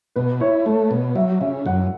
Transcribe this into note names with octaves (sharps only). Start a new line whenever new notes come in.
B2 B4
E4 C#5
A3 C#5
B2
F#3 E5
C#3 E5
F#2 F#5